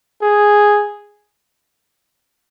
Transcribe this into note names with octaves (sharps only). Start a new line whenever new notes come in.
G#4